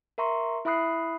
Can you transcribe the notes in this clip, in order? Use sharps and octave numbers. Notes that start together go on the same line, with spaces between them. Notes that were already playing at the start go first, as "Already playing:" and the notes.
A#4 E5 A#5 C6 C#6
E4 E5 B5 D#6 F#6 C7